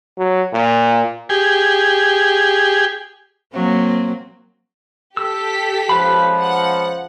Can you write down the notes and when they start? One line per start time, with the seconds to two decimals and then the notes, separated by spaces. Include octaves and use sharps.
0.18 F#3
0.53 A#2
1.29 G4 G#4
3.54 F#3 A#3 C4
5.17 G4 A4 E6 B6
5.89 C#2 F3 B4 F5 B5
6.39 F#5